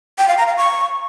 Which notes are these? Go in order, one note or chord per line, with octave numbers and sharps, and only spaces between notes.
G5
F5
A#5
F5
C#6